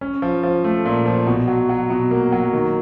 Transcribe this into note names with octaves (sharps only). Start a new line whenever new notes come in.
C#4
F3
F3
A3
A#2
F3
B2
F#3
F#3
B2
A#3
F#3
D#3